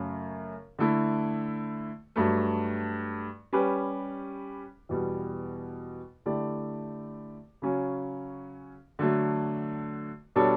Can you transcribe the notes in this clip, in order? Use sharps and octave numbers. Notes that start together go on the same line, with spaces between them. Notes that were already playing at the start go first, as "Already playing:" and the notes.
Already playing: F#2 C#3 A3 C#4
D3 A3 E4
G2 F#3 A3
G3 C#4 G4 B4
E2 B2 G3
D3 A3 E4 G4 D5
C#3 F#3 C#4
D3 F#3 A3
B2 G3 D4 A4 C#5